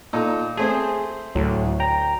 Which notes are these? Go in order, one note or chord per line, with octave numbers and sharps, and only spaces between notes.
A#2 D#4 A4
A3 C4 G#4 C5
D2 A2 F#3
G5 A#5